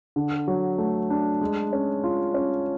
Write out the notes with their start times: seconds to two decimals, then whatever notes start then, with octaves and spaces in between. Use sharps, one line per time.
0.16 D3
0.48 F#3
0.78 A3
1.10 D4
1.41 G#3
1.73 C#4
2.04 F4
2.34 C#4